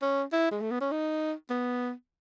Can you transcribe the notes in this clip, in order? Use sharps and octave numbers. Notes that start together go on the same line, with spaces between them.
C#4
E4
G#3
A3
B3
C#4
D#4
B3